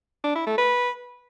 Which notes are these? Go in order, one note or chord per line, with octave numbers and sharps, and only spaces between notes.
D4
E4
A3
B4